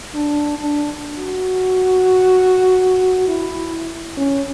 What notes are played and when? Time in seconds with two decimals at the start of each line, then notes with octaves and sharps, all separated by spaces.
0.14 D4
0.59 D4
1.18 F#4
3.28 E4
4.17 C#4